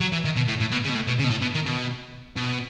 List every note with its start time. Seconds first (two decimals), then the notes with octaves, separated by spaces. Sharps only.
0.01 F#3
0.13 E3
0.25 D#3
0.36 B2
0.48 A2
0.60 A2
0.71 B2
0.84 C#3
0.89 B2
0.95 A2
1.07 B2
1.19 C#3
1.24 B2
1.30 A2
1.41 B2
1.54 D#3
1.66 B2
2.36 B2